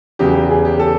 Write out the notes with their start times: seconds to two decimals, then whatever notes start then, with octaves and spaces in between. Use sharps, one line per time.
0.19 E2 C#3 F#3 G4
0.35 G4
0.50 G#4
0.65 G4
0.80 A4